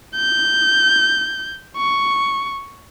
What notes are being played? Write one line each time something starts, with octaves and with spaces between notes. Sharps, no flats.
G6
C#6